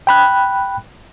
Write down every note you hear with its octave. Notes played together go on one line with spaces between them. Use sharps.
G5 B5 F#6